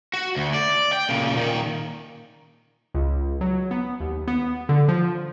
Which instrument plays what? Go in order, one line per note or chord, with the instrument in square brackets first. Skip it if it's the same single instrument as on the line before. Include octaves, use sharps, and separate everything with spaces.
[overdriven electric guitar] F#4
D2
D5
G5
A#2 C#3
A#2 D#3
[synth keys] C#2
F#3
B3
D#2
B3
D3
F3